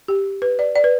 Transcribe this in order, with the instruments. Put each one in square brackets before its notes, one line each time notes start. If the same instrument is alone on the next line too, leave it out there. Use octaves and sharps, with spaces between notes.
[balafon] G4
B4
D5
D5
B4